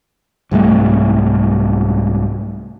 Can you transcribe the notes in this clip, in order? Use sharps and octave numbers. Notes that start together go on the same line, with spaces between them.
C2 G#2 G3 A3